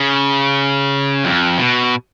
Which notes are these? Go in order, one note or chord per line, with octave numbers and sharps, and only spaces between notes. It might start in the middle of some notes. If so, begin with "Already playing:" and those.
Already playing: C#3
F2
B2